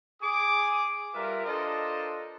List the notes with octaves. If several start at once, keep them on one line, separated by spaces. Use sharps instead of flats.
G#4 D6 D#6
G3 F4 A#4 B4 E5
D4 F4 A4 A#4 C5 D#5